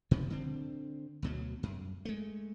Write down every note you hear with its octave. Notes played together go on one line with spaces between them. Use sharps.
A#2 C#3 F3
D3 C4
D2 B2 F#3
F#2
G#3 A3